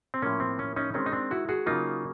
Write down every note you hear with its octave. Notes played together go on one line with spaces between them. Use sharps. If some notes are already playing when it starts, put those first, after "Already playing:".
C4
A2 F3 A#3 C#4
C4
C#4
C#4 D#4
D#3 G#3 C4 C#4
D#4
C4 D4
E4 F#4
F#4 G#4
C#3 F#3 A#3 D#4 F4